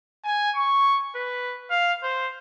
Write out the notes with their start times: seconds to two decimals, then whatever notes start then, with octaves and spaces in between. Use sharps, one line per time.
0.24 G#5
0.55 C#6
1.15 B4
1.70 F5
2.03 C5